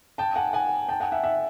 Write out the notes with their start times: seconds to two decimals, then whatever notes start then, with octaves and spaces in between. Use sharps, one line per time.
0.18 G5 A5
0.36 F#5 G#5
0.53 F#5 G#5
0.89 G5 A5
1.00 F#5 G#5
1.12 E5 F#5
1.23 E5 F#5